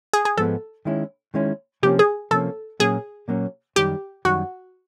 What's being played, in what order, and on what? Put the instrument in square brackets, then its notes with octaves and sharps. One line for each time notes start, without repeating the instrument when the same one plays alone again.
[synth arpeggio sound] G#4
G#4
[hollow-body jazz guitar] G#2 F3 G#3 B3 [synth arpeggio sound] A4
[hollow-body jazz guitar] D#3 G#3 C#4 E4
D#3 G#3 C#4 E4
[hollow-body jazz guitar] C3 F3 A#3 C#4 [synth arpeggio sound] G4
[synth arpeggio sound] G#4
[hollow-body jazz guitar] C3 F3 A#3 C#4 [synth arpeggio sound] A4
[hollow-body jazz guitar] A#2 F#3 A#3 C#4 [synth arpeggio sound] G#4
[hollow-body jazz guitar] A#2 F#3 A#3 C#4
[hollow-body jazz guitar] F#2 D#3 G3 [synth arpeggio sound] G4
[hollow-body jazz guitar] F#2 D#3 G3 [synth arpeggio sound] F#4